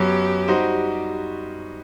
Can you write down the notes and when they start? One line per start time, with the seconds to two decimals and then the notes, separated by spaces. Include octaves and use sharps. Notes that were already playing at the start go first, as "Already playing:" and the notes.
Already playing: F#2 F#3 B3 G4
0.48 G3 D#4 F#4 C5